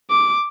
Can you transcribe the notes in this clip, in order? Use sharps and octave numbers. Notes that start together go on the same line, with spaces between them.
D6